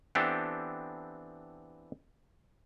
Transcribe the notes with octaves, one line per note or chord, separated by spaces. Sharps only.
E3 B3 C4 D4 G4 A4